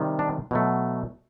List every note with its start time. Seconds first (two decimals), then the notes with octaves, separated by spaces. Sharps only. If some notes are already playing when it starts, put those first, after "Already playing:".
Already playing: C3 D#3 G3
0.19 D4
0.51 B2 F#3 A3